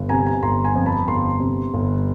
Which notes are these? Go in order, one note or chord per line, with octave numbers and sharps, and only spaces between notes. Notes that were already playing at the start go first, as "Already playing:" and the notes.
Already playing: G1
C3 G#5 A#5
G#5 A#5
G1 A#5 C6
G#5 A#5
F2
A5 B5
G1 A#5 C6
C3
G1